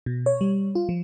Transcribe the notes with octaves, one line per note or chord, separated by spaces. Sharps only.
B2
C#5
G3
F4
F3